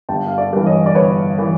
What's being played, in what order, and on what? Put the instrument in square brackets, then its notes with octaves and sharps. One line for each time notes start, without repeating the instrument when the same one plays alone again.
[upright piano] G1 G5 A5
F5
D5 E5
G2 E3
C#5 D#5
D5
G1 B4 C#5
E3